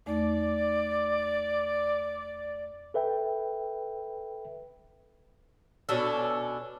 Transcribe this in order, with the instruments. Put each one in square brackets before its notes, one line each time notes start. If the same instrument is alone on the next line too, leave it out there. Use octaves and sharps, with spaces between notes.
[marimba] E2 A3 D#4 [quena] D5
[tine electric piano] A4 B4 E5 G5
[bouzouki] B2 C#4 D4 A4